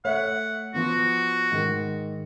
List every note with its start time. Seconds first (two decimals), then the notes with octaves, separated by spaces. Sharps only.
0.05 A3 C#5 E5 F#5
0.74 F3 B3 F#4
1.52 G#2 D#3